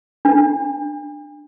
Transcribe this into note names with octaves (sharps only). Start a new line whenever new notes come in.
D4